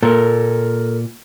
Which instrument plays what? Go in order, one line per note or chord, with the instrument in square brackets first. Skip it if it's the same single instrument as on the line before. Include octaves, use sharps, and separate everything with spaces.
[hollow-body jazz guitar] A#2 [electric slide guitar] A4 A#4